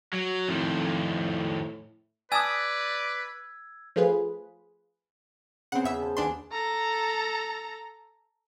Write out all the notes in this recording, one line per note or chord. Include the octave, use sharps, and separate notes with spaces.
F#3
F2 A2 D#3
B4 D5 G#5 A5 D#6 E6 G#6
F3 A3 F4 G#4 B4
C#3 B3 C4 F#5
E2 E5 E6
C5 F5 A5
D#2 B3 D4 F5 G#5 C6
A4 A#5